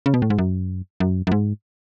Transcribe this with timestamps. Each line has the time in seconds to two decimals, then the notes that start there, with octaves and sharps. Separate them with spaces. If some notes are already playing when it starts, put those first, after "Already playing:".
0.06 C#3
0.14 B2
0.22 A2
0.30 G#2
0.38 F#2
1.00 F#2
1.27 F#2
1.32 G#2